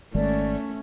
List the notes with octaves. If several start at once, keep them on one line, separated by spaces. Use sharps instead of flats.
G#1 D#3 G#3 A3 C#4 D5